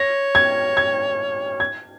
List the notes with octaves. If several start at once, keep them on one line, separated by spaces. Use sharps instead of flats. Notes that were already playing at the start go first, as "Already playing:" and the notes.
Already playing: C#5 A#6
G#6
G#6
G#6